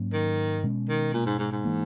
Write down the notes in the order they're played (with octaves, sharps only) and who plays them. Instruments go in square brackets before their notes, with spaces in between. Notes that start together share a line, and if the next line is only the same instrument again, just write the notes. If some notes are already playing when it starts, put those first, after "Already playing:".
Already playing: [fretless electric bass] G#2 F#3 A#3 C#4
[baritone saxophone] D#3
[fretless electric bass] B2 G#3 C#4
[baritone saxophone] D#3
A#2
G#2
G#2
G#2
[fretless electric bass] E3 A#3